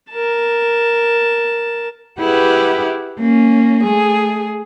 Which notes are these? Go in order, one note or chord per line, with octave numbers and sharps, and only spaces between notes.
A#4 A5
E4 G4 G#4 B4 F#5
A#3 C#4
A3 G#4